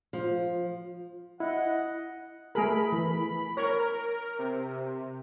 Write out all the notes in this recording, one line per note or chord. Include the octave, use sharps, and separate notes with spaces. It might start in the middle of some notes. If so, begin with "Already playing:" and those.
F3
E4 D#5 F#5
A3 G#4 A#4 B5
E3
A#4 C#5
C3